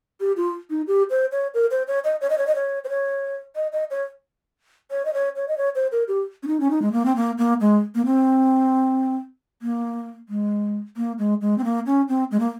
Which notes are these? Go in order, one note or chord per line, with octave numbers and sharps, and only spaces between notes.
G4
F4
D#4
G4
C5
C#5
A#4
C5
C#5
D#5
C#5
D#5
C#5
D#5
C#5
C5
C#5
D#5
D#5
C#5
C#5
D#5
C#5
C#5
D#5
C#5
C5
A#4
G4
C#4
D#4
C#4
D#4
G#3
A#3
C4
A#3
A#3
G#3
A#3
C4
A#3
G#3
A#3
G#3
G#3
C4
A#3
C#4
C4
G#3
A#3